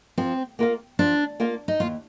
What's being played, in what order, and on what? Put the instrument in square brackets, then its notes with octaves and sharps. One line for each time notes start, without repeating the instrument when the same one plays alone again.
[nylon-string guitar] F3 [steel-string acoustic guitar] C4
[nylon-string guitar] A#3 F4 A#4 F5
[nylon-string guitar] F3 [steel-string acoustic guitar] D4
[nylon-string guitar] A#3 F4 A#4 F5
[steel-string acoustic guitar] D#4
[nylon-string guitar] D#2 [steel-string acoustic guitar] F4